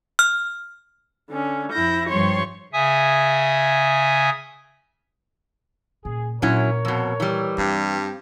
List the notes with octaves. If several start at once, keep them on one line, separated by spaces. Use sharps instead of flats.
F6
D3 C#4
F2 E4 G6 A#6
G2 F3 G3 C#5 C6 C#6
C#3 E5 G#5 D#6
A#2 C#3 G#4
A#2 F#3 C#4 E4 A#4 C#5
F2 B2
E3 G3
G2 C4
F3 G4